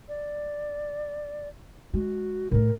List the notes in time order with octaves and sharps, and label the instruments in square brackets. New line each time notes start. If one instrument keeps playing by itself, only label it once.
[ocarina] D5
[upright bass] G#3 [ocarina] F#4
[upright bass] A2 A3 [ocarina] A#4